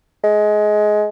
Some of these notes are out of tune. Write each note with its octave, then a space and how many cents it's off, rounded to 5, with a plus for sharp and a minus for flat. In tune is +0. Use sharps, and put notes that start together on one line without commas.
G#3 +20